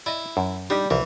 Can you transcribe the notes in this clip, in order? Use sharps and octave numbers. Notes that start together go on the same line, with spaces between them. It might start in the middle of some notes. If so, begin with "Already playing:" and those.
E4 D5 D#5
F#2
G3 D4 D#4 G4
C2 E3 F3 A#4